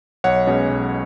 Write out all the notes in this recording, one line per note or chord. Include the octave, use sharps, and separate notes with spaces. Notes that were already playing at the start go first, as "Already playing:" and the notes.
B1 C#5 F#5
B2 G#3 C#4
B1